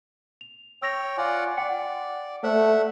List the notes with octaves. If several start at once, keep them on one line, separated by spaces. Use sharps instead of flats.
F7
C#5 G5 E6 A#6 F7
F4 D5 F#5 G#5
D5 F#5 G5 C#7
A3 C5 D5 E5 F#5